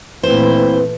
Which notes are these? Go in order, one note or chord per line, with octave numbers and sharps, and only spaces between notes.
A#2 E3 A3 A#3 C4 E4 B4 C5